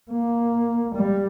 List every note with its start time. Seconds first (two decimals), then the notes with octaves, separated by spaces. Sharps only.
0.12 A#3
0.96 G3